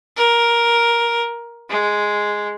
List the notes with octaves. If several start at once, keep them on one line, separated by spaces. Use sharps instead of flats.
A#4
G#3